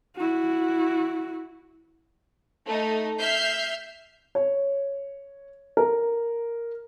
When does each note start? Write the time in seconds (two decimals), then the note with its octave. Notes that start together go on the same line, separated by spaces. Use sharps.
0.16 E4 F#4
2.66 A3 D#4
3.20 E5 F6 G6 C7
4.35 C#5
5.77 A#4